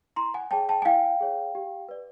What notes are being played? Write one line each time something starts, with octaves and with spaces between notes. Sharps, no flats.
E4 A#5 C6
F#5 G#5
G#4 C#5 G5 A5
G5 A5
G#5
E4 F5 G5
G#4 C#5
G4
B4 D5